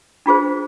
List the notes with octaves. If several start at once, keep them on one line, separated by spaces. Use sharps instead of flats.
D4 F4 G#4 C5